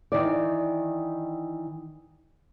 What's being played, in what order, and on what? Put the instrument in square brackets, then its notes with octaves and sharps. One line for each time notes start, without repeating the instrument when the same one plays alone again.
[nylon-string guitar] D#3 E3 D5